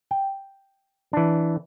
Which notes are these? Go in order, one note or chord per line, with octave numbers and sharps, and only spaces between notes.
G5
E3 D4